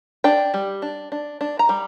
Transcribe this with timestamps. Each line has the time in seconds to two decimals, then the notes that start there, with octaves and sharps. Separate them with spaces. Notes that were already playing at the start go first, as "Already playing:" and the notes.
0.24 D4 G5
0.54 G3
0.82 D4
1.12 D4
1.41 D4
1.59 A#5
1.69 G3